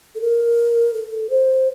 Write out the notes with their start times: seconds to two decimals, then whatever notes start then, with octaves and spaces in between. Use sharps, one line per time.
0.15 A4
0.21 A#4
0.94 A4
1.30 C5